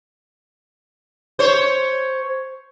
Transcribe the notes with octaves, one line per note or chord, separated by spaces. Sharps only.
C5 C#5